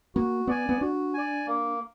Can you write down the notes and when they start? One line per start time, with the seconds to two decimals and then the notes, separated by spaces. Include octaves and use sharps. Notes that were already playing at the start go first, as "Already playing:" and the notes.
0.15 A#3 F#4
0.47 B3 D5 G#5
0.69 B3
0.81 D4 F#4
1.14 D5 G#5
1.47 A#3